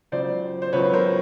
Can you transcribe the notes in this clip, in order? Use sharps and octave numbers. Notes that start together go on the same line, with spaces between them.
C#2 C#3 F#3 C5 D5
C5
C#2 C#3 F#3 B4 C#5
A#4 C5